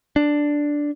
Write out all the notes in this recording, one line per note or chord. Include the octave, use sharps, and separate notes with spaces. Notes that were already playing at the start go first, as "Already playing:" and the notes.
D4